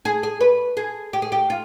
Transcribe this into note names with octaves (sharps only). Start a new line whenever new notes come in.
G#4
G#4
B4
G#4
G4
G#4
G4
F4